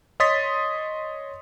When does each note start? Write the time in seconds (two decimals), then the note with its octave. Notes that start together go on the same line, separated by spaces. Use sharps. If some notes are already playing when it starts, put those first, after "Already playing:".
0.20 C#5 D#5 C6 D#6 A6 B6